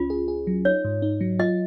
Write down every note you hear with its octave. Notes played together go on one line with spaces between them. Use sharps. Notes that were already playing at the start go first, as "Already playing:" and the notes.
Already playing: C#2 C#4 F4
G#4
G#4
F#3
D#4 C#5
G#2
D#4
F#3
F4 D#5